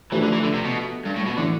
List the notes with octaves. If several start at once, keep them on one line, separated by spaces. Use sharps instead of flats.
E3 F3 A3 D4 G4
D3
E3
D3
C3
B2
G2
A2
B2
A2 D3 E3 A3